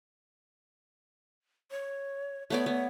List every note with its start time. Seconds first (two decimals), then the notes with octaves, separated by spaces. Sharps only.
1.71 C#5
2.50 A3 B3 C#5 D5
2.66 B3